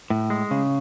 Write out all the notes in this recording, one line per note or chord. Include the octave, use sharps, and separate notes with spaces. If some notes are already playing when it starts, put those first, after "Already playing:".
A2
G#3
C#3